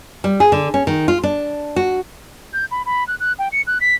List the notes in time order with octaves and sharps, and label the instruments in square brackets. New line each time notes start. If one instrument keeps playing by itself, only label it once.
[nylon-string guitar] G3
G#4
D3
C#4
D#3
F4
D4
F#4
[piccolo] G6
B5
B5
F#6
F#6
G5
C#7
F#6
B6